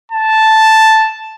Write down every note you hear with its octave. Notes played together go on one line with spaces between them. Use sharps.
A5